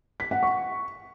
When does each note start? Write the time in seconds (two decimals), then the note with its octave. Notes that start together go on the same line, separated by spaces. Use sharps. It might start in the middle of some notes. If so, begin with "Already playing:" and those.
0.20 B6
0.31 F#5
0.43 C#6